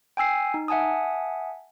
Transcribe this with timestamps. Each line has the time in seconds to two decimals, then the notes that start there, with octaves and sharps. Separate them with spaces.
0.17 G5 G#5 E6 C7
0.54 D#4
0.68 E5 F#5 G#5 A5 D#6